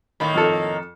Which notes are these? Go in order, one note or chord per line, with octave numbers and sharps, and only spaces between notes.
A2 D#3 A#3 B5
F2 A4